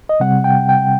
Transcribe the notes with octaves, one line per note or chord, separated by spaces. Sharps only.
D#5
C3 G3 C4 F#5
G5
G5